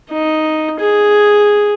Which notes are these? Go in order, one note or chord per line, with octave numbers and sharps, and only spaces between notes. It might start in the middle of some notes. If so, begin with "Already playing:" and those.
D#4
G#4